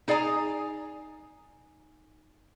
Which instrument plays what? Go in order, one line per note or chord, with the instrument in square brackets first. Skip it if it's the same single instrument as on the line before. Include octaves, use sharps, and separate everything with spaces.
[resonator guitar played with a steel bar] D#4 G#4 D5 G#5 A#5